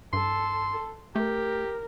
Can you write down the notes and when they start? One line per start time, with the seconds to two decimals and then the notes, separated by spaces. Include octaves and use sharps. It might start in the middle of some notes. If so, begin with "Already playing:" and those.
0.13 G2 A4 C6
1.16 A3 G4 A#4